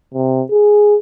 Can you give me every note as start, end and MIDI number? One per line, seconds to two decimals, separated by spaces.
0.14 0.43 48
0.50 0.96 68